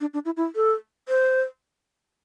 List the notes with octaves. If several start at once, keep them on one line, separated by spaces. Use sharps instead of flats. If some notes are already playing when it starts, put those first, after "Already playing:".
D4
D4
E4
E4
A4
C5